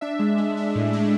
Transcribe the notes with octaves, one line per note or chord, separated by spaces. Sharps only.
D4 E5
G#3
G#3
D4
A2
D4